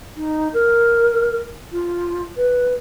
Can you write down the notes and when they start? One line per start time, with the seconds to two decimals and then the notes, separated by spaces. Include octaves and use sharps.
0.17 D#4
0.53 A#4
1.72 F4
2.37 B4